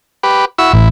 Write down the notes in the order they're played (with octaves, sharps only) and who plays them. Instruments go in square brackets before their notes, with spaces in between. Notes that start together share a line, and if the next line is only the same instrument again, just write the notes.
[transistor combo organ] G4 B4
E4 F#4 E6
[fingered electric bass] A1 [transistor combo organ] E4